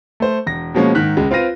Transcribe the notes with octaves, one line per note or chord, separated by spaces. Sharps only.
A3 C5
E1 A#6
B2 F3 G#3 A#3 C#4
G#2 D#3 F#6 B6
C#2 G#3
C4 F4 B4 F5 A#6 D#7